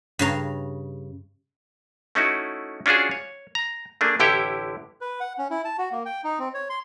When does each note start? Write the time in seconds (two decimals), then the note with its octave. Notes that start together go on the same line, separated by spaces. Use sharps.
0.19 G2 C#3 A#5
2.15 A3 C#4 D#4 E4 F#4
2.86 C#4 D4 F4 F#4 G#4
3.11 C#5
3.55 A#5
4.01 A3 A#3 D4 G#4
4.20 A1 D3 E4 G4 C#5 G5
5.01 B4
5.20 F#5
5.38 C#4
5.51 E4
5.65 A5
5.78 F#4
5.91 A#3
6.06 G5
6.24 D#4
6.39 C4
6.54 C#5
6.69 C6